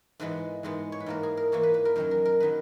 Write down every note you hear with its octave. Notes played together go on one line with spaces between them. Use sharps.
G#2 E3 G#3 B3 B4
G#2 E3 G#3 B3
C#5
B4
G#2 E3 A#3 A#4
G#4
A#4
G#2 E3 A#3 C#5
B4
B4
A#4
F#2 D#3 F#3 A#4
A#4
A#4
D#3 F#3 B4